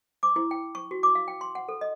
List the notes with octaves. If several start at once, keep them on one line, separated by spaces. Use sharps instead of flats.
D6
E4
G5
C#6
F#4
D6
F5
G5
C6
F#5
A4
D#5